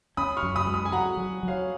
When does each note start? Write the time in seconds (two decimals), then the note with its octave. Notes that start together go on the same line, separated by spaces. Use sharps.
0.17 C#4 B5 D#6
0.37 C#6 F6
0.43 F#2
0.56 B5 D#6
0.67 G#3
0.74 B5 D#6
0.85 G#5
0.92 F#3 F#5 A#5
1.17 F#3
1.43 F#3
1.48 C#5 F5